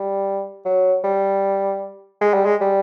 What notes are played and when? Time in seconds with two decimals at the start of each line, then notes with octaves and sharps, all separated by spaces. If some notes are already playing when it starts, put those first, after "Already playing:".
Already playing: G3
0.65 F#3
1.04 G3
2.21 G#3
2.34 G3
2.46 G#3
2.61 G3